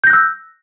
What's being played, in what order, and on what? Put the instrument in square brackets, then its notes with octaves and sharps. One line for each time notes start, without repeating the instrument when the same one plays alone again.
[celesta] G6
A#6
F#6
E6